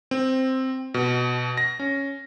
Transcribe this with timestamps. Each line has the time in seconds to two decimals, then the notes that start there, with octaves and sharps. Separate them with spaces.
0.11 C4
0.94 B2
1.57 A#6
1.79 C#4